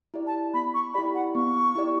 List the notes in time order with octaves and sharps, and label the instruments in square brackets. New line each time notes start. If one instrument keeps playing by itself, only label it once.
[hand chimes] E4 G4 D5
[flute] A5
[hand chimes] B3 [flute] B5
[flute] C#6
[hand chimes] E4 G4 D5 [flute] B5
[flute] F#5
[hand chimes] B3 [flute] C#6
[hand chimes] E4 G4 D5